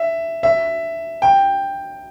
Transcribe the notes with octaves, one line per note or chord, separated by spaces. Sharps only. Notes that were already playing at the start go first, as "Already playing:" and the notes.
Already playing: E5
E5
G5